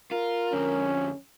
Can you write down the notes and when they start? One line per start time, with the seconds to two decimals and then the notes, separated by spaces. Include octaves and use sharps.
0.11 F4 A#4
0.53 F2 D3 C#4